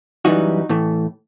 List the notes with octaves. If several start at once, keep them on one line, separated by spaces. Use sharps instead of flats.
F#2 E3 G3 D#4 F#4
A2 E3 A3